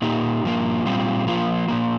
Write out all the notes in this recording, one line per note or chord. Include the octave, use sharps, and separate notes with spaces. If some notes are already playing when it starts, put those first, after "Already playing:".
A#2 A#3 D#4 G4
G2 F3 A#3
A#2 G3 C4 F4
F3 A#3 F4
A#2 F3 A#3